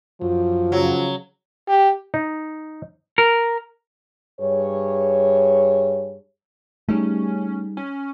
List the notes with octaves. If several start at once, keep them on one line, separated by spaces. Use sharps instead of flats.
F#2 F3
C#3 F#3
G4
D#4
A#4
G2 G#4 C#5
G3 A3 C#4 D#4 G#4
C#4